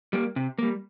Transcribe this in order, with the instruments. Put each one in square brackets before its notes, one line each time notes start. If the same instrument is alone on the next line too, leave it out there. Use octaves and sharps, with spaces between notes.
[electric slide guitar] G3 A#3
C3
G3 A#3